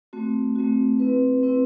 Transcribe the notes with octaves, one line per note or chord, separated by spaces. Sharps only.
A3 C4 F#4
A3 C4 F#4
C4 E4 B4
C4 E4 B4